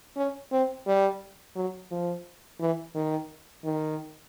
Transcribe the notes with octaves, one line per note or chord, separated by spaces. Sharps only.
C#4
C4
G3
F#3
F3
E3
D#3
D#3